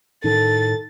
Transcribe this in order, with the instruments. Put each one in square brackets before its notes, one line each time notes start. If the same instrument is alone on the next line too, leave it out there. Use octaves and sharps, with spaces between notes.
[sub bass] A2 [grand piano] D#3 [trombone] A4 [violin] A6